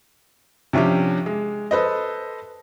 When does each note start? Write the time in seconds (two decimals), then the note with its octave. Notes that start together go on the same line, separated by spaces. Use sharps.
0.73 C3 F3 C#4 D4 G4
1.26 G#3
1.71 A4 B4 C5 D#5